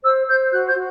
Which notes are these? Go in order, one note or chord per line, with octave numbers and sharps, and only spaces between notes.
C5 E6
C5 G6
F#4 F#6
G6
F#4